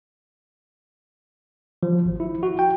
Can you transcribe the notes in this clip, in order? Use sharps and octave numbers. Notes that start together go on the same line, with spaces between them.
F3
G#1
E4
F#4
G5